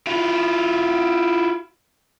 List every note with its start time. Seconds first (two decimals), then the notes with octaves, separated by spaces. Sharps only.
0.07 E4 F4